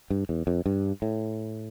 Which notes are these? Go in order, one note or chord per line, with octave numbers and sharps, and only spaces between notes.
G2
E2
F2
G2
A2